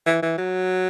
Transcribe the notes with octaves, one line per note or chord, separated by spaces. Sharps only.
E3
E3
F#3